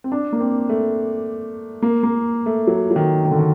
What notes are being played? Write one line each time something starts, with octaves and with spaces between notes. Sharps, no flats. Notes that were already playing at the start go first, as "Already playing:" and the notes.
C4
D4
A#3
C4
A3
A#3
A#3
A3
F#3
F#3
D#3
D#3
D3
D#3